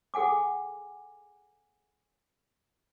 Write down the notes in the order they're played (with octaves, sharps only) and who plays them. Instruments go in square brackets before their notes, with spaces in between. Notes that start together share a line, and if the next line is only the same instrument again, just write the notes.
[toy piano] G#4 A4 F#5 G#5 D6